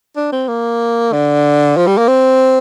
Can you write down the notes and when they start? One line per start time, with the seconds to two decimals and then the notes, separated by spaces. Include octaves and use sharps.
0.16 D4
0.32 C4
0.48 A#3
1.13 D3
1.77 F3
1.87 G3
1.98 A#3
2.08 C4